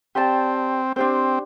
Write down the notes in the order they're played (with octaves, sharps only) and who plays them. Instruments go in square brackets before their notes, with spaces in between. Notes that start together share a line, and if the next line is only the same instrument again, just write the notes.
[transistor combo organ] C4 [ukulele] G4 D5 A5
[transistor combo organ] C4 [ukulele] D4 G4 C5